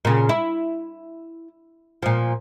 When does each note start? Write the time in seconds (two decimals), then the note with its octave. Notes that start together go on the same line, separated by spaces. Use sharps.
0.05 A#2 C#3
0.29 E4
2.02 A#2 F3